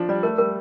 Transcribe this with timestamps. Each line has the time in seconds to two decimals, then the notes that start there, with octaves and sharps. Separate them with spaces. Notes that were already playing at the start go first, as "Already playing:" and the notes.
Already playing: F3 D4
0.09 G3 D5
0.23 A3 A#4
0.38 G3 A#4